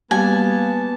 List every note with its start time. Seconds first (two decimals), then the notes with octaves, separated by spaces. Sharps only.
0.11 G3 A#3 B3 F#4 G#5 A5